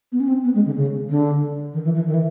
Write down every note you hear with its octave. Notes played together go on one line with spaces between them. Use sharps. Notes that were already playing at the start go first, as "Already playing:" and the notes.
B3
C#4
C4
B3
G#3
D3
C#3
D3
D#3
E3
E3
D#3
E3